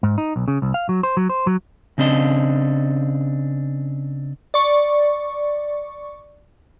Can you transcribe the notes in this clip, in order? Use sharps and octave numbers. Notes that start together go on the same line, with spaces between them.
G#2
D#4
B1
C#3
C2
F5
F#3
C5
F#3
C5
F#3
C#3 C4 D4 D#5
D5 C#6